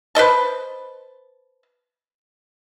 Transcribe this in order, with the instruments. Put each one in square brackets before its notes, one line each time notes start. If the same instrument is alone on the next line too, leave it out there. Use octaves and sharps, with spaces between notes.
[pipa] B4 C5 D#5 A5